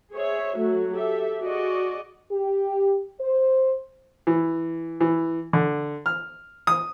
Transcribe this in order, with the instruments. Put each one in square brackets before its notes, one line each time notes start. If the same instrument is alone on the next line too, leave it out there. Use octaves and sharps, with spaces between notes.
[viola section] G#4 C5 C#5 E5
F#3 A3 F#4
G4 A4 E5
F#4 G#4 D5 D#5
[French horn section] G4
C5
[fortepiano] E3
E3
D3
F6
D#6